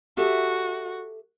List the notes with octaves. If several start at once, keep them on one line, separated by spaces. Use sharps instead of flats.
F#4 G4 A4 E5